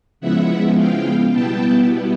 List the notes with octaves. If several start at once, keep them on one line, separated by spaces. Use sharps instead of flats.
C#3 F3 G#3 B3 E4 E5 F#5
F5 G5
B2 G3 B3 E4 G5 A5